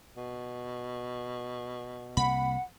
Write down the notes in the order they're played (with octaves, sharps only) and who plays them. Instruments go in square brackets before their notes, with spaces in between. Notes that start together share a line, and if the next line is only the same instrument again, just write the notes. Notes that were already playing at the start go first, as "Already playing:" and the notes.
[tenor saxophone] B2
[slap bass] C2 C3 A#3 [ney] F#5 [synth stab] B5